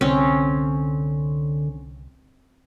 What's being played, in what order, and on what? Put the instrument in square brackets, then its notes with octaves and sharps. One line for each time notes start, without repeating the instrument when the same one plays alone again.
[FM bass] C2 [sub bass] D3 [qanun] C4 C#4